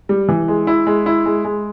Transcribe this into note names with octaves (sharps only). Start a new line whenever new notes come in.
G3
E3
G#3
E4
G#3
E4
G#3
G#3